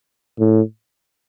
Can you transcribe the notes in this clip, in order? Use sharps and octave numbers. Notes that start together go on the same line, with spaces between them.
A2